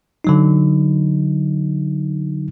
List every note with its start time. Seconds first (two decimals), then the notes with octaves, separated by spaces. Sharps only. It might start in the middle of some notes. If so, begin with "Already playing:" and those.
0.24 D3 F#3 D#4